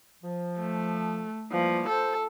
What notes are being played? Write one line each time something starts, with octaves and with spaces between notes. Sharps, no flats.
F3
A3
E3 F3 G3 A#3
A4 C5